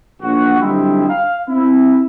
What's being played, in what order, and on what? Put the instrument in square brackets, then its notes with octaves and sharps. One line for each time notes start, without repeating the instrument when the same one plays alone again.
[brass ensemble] A#1 F#4
D3 F#3 G3 C4 D#4 E4
F5
C4 E4